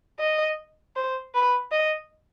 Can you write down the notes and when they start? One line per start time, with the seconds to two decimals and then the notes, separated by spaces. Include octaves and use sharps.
0.19 D#5
0.96 C5
1.35 B4
1.72 D#5